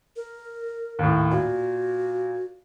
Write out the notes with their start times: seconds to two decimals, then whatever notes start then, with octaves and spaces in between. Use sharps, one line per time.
0.16 A#4
0.99 D#2 A2
1.31 A#2 F#4